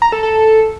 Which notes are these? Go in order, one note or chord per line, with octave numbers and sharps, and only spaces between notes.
A#5
A4
A4